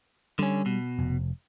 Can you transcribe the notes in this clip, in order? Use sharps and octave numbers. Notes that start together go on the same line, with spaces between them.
D3 G3 C#4
B2
F1